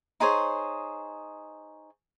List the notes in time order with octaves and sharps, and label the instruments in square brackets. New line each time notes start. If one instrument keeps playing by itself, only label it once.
[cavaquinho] D#4 G#4 C5 C#5